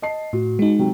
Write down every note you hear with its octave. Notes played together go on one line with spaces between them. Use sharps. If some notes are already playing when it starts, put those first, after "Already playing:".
D#5 A5 C7
A2 F#4
G#3 D#4
C3 F#3 C4